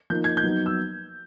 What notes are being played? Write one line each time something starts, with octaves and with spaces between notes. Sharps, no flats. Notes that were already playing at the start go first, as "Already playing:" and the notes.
F3 A#3 D#4 G6
G#6
G6
F#3 B3 D#4
E6